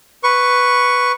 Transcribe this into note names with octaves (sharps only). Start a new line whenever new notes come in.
B4 C#6